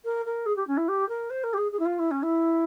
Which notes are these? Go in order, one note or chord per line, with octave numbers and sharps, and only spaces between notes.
A#4
A#4
G#4
G4
C#4
E4
G4
A#4
C5
A#4
G4
G#4
G#4
E4
F4
E4
C#4
E4